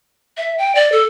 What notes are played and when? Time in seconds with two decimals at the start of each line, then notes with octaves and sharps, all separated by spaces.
0.37 E5
0.59 G5
0.75 D5
0.92 A4